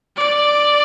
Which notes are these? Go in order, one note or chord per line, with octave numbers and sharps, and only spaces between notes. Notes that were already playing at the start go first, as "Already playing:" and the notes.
D5